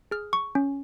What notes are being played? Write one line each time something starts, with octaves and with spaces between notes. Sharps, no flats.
G#4 F6
C#6
C#4